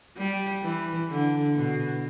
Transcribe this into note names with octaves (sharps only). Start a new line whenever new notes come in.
G3
E3
D3
B2